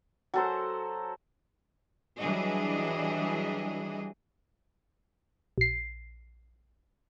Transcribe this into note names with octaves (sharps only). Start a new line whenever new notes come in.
F#3 A4 C5
E3 F#3 G3 D4 G#4 D#5
A#1 C7